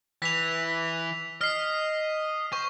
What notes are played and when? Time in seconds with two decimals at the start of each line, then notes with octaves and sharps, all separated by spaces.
0.22 E3 B6 F7
1.41 D#5 F6 C7
2.53 C5 C#6